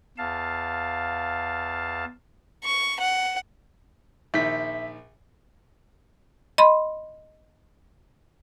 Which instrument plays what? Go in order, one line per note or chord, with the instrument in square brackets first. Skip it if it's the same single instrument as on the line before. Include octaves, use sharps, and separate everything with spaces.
[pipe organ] E2 F5 A5
[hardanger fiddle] C#6
F#5
[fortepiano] A#1 D#3 [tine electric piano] E5 B6
[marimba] D#5 B5 C6